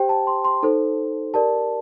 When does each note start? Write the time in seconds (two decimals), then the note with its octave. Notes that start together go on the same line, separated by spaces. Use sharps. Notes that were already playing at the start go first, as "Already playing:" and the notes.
Already playing: G4 C5 G5
0.09 A5
0.27 C6
0.45 C6
0.63 D#4 A4 C5
1.34 G4 A#4 D5 A5